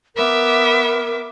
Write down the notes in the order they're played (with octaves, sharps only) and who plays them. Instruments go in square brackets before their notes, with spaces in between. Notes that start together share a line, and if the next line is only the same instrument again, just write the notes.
[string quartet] B3 E5 D6 [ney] A#4